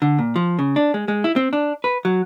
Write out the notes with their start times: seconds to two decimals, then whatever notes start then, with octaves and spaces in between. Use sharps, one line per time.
0.02 D3
0.19 A#2
0.36 F3
0.59 C#3
0.76 D4
0.94 G#3
1.08 G#3
1.24 E4
1.36 C4
1.53 D4
1.84 B4
2.05 F#3